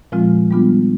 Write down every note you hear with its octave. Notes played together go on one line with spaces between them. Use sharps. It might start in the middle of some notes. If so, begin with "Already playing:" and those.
A#2 F3 G#3 C4 F4
D#3 G3 B3 D4 F4